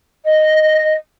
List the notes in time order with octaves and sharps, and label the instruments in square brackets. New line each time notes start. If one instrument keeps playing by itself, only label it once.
[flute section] D#5